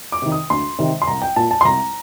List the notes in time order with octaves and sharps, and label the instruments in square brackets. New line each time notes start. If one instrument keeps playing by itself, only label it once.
[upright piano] D6
C3 D#3
D#6
D2 C6
C3 D#3
C6
C2 A#5
G5
A#2 A5
A5
C6
C2 A#5